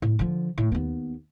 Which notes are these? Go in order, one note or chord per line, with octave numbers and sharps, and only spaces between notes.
A2
D3 F3
A2
D#2 B3